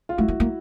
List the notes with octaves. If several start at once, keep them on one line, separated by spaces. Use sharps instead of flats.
F4
A3 E4 F#4
A#3
A#3